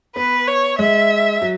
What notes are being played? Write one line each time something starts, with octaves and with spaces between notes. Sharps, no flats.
B3 B4
C#5
G#3 E5
F#3